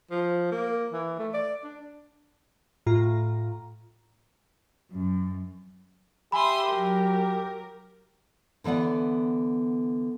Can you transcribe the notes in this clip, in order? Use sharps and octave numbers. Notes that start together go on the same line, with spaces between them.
F3
A#3
E3
A3
D5
D4
A2 F4 A#5
F#2
G4 E5 G#5 B5 C6 D#6
F#3 A#4
D3 E3 B3 D5 F#5